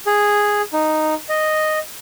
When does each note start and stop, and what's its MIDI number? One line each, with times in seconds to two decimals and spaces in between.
0.06 0.62 68
0.73 1.15 63
1.29 1.79 75